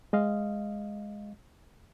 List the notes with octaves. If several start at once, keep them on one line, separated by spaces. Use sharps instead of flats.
G#3 D#5 F5